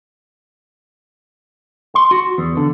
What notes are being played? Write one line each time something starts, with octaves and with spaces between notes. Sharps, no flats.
C6
F#4
E2
D3